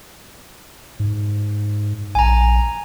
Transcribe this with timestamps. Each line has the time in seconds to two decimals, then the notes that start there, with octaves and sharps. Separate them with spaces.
1.00 G#2
2.15 A#1 G#5 A#5